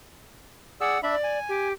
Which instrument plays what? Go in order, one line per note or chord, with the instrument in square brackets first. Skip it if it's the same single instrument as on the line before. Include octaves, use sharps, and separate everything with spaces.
[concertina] G#4 D5 E6 [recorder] F#5
[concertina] D4 E5 B5 [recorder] D5
[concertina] G#5
[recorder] G4